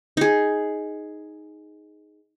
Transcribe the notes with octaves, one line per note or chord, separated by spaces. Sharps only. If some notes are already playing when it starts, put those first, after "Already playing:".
D#4 G#4